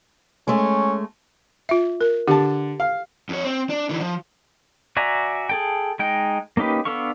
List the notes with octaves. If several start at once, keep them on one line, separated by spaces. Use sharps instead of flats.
G#3 A3 C#4
F4 E5
A#4
D3 G4 A5
F5
F2 C#5
C4
D4
D3 E3
F3
F#4 D5 E5 G#5 A#5
G#4 A4 G5
G#3 D#4 G5
A#3 C#4 D#4 G4 B4
B3 D4 A4 F5 C#6